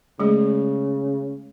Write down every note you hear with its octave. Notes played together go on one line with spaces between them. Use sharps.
C#3 G#3 A3 G#4